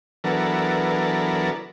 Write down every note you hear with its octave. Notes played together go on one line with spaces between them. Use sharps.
E3 F#3 B3 D4 A4 A#4